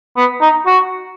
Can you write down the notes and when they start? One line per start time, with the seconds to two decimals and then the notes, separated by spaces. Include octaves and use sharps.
0.17 B3
0.41 D#4
0.66 F#4